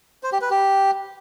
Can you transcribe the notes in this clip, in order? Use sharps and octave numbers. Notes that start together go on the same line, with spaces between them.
C5
G4
B4
G4